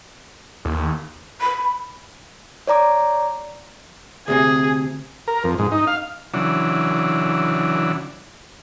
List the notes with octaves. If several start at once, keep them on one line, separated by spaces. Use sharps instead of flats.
D#2
B5
C#5 D5 A#5 D6
D2 C3 C4 G#4
A#4
F2
G#2
D#4
F5
C#3 E3 F#3 D4